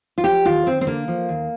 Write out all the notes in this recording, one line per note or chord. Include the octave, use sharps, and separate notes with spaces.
F4
F3 G4
D#2 F4
D#2 C4
C4
D3 A#3
F3
D#2